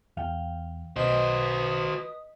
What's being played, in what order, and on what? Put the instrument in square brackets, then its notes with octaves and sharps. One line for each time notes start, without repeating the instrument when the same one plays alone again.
[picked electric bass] E2 [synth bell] F5 G5
[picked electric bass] B1 [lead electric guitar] F#4 C5 [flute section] B4 D#6 [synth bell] D#5 B6